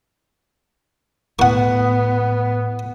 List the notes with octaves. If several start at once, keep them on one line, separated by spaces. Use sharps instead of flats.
A2 B3 F#5 C#6